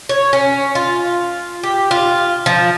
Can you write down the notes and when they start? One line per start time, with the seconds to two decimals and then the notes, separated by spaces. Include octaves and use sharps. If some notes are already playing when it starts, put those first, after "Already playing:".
0.09 C#5
0.33 C#4
0.75 F4
1.63 G4
1.91 F4
2.46 F3